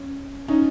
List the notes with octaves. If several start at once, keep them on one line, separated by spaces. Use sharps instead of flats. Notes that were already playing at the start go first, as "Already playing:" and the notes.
Already playing: C#4
C#4 D#4